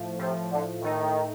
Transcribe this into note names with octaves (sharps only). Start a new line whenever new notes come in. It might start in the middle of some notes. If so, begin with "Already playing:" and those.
Already playing: A2 F3 A3
A2 C3 F3 A3
D3
A2 D#3 A3 D#4